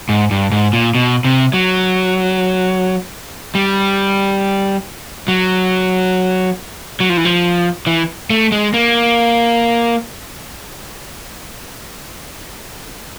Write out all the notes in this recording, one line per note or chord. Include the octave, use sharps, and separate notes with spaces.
G#2
G2
G#2
A#2
B2
C3
F#3
G3
F#3
F#3
F3
E3
F3
E3
A3
G#3
A#3